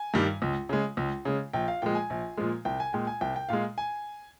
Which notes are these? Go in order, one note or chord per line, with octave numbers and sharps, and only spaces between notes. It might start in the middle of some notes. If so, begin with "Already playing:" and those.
Already playing: G#5
G2 D#3 G3
C#2
C#3 G#3
C#2
C#3 G#3
A#1 G5
F5
A#2 F3 G#3 G5
G#5
A#1
A#2 F3 G#3
C2 G5
G#5
A#2 G#3 G5
G#5
C2 G5
G5
A#2 G#3 F5
G#5